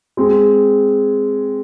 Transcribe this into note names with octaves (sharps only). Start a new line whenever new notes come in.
G#3 C4 G#4